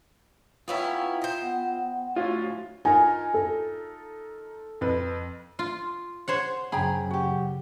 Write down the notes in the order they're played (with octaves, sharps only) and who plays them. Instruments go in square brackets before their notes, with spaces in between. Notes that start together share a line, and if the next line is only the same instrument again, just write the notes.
[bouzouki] B3 C#4 E4 [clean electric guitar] F4 E5 [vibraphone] F5 G5 A#5
[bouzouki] C5 D#5
[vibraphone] B3 F#5 G5
[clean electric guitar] A2 D3 C#5 [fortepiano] F4 [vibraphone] F#4
[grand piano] D#4 F4 A#4 [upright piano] G#5
[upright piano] A4
[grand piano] F2 B4
[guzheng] F4
C5 C#5 F#5
[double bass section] F#2 C#3 F#3 [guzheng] G#4 [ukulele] G5 A#5 B5
[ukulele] F#4 G4